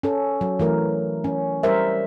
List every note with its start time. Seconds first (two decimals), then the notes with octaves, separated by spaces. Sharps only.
0.03 C#4 A4
0.41 F#3
0.60 E3 A3 A#4
1.24 C#4
1.63 G3 A#4 C5 E5